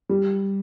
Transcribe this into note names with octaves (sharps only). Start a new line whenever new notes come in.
G3